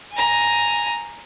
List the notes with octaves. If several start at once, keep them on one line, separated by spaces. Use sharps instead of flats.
G#5 A#5